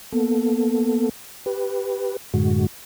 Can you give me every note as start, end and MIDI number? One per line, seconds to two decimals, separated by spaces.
0.12 1.09 58
0.12 1.09 59
0.12 1.09 69
1.46 2.17 67
1.46 2.17 71
2.34 2.67 42
2.34 2.67 45
2.34 2.67 50
2.34 2.67 56
2.34 2.67 66